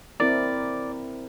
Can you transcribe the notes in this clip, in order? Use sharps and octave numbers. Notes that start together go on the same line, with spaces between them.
C4 E4 A#4 D5